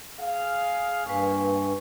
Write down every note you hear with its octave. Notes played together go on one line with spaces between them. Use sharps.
G#4 F5
G2 A#2 B4 G#5 C#6